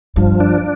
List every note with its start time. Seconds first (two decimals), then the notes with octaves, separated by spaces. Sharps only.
0.16 G2 F3
0.40 D4